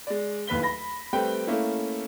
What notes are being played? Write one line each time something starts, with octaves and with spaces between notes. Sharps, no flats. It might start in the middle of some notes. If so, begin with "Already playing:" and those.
G#3 D5
D1 D#2 B4 B6 G7
B5 A#6
G3 A3 C4 B4 G5
A3 A#3 C#4 E4